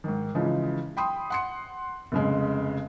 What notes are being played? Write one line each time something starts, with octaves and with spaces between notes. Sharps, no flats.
G#2 D#3
C#3 E3 F3 G#3 D#4
G5 B5 C6 D#6
F#5 C6 C#7
F1 C#3 G#3